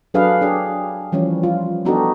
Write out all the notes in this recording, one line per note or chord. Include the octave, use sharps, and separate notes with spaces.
F#3 D4 G#4 A4 B4 F5
D4 G4 G#4
E3 F3 G3 C#4
F4
B3 D4 D#4 F#4 G4 A4